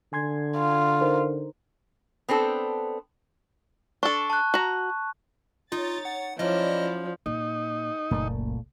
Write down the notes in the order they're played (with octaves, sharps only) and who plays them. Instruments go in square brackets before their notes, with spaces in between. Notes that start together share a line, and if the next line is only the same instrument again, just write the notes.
[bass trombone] D3 [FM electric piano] G#5 C6 G#6
[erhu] F4
[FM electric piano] D#4 A#4 C5
[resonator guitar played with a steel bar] B3 C4 D4 A4
[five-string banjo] D4 A4 [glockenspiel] C#6
[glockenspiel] A5 F#6
[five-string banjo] F#4 A#5
[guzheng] D#4 [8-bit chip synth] F4 [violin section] C#5 A6
[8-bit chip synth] F#5
[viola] F3 [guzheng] F#3 C#4 [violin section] E4 D5 [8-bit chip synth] D#5
[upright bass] A#2 [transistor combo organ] D#4
[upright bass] F#1 C#2 [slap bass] A#2 A3